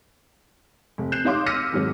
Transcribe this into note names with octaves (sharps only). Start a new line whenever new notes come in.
F1
F#6 G6 C7 E7
D#4 G4 C#5 F5 C6 D6
E6 F6 A#6 B6 C#7 D#7
F2 G#2 D#3 F#3